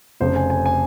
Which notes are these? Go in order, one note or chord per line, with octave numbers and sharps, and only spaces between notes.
F1 F2 C#3 C5
G#5
G#5
G#5